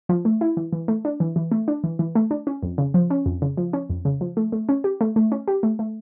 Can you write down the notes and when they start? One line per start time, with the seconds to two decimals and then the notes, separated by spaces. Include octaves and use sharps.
0.09 F3
0.25 A3
0.41 E4
0.57 E3
0.72 E3
0.88 A3
1.05 D4
1.20 E3
1.36 E3
1.52 A3
1.68 D4
1.84 E3
1.99 E3
2.15 A3
2.31 D4
2.47 C#4
2.63 F2
2.78 C#3
2.94 F3
3.10 C#4
3.26 F2
3.42 C#3
3.57 F3
3.73 C#4
3.90 F2
4.05 C#3
4.21 F3
4.37 A3
4.52 A3
4.69 C#4
4.84 G4
5.01 A3
5.16 A3
5.32 C#4
5.48 G4
5.63 A3
5.79 A3